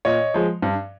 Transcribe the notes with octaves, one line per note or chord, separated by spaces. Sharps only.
A#2 C#5 D#5
F3 G#3
G2